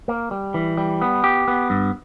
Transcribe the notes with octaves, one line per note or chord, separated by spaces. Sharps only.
A#3
G3
E3
G3
B3
G4
B3
G2